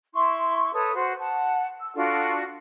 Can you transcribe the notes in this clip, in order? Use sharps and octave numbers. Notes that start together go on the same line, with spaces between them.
E4 C6 C#6
A4 B4 C#5 D#6
F#4 C5
F#5 A5
E6
D4 F4 F#4 A4